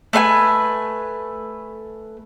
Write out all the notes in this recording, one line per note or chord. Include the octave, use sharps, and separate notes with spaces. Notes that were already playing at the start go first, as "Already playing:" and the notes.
A3 B4 F5 G#5